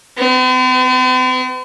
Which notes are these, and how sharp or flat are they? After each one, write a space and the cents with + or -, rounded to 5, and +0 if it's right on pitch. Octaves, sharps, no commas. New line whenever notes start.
C4 -45